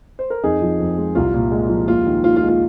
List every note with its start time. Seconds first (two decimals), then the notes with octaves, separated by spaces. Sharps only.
0.19 C5
0.30 A#4
0.44 F2 D#4 G#4
0.62 F3
0.80 F2
0.98 G#3
1.15 C2 F4
1.34 A#2
1.51 G#3
1.69 F3
1.88 D#2 F4
2.06 D#3
2.23 D#2 F4
2.36 F4
2.42 G#3
2.48 F4